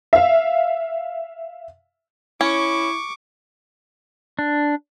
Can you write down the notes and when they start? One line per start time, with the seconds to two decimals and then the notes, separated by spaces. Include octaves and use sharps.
0.13 E5 F5
2.41 C#4 E4 C#6 D6
4.39 D4